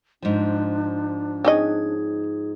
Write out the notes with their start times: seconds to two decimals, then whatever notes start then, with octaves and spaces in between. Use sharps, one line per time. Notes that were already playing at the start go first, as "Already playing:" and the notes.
0.22 G#2 F3 D4
1.45 C4 C#4 D#4 G#4 D#5